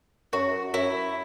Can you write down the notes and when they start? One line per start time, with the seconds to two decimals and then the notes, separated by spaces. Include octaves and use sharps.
0.33 F#2 F#4
0.74 F#2 E4